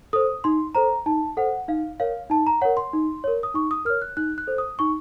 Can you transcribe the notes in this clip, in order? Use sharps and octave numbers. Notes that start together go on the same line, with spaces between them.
A4 C5 D#6
D#4 C6
A4 C5 A#5
D#4 A5
A4 C5 F#5
D#4 F5
A#4 C#5 F5
D#4 A5
A#5
A#4 C#5 F#5
C6
D#4
A#4 C#5
D#6
D#4 C#6
D#6
A#4 C#5 F6
F#6
D#4 F#6
F#6
A4 C5
D#6
D#4 C#6